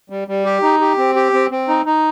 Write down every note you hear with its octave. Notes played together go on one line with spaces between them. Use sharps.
G3
G3
G4
D#4
G4
C4
G4
C4
C4
D#4
D#4